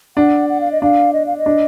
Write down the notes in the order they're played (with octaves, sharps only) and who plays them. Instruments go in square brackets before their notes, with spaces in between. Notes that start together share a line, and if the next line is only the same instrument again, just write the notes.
[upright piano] D4 [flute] F#5
[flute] F#5
F5
D#5
[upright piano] D4 [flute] F5
[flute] D#5
F5
D#5
[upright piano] D4